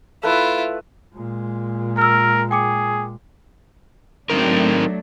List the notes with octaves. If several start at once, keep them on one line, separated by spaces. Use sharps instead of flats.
A3 E4 F4 B4
A#2 G#3
A#4 E6 F6
G#4 G5 D6 C#7
F#3 A3 C4 D4 D#4 A#4